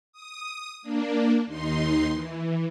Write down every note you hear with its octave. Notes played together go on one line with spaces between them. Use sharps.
D#6
A#3 D4
D#2 D#4 C6
E3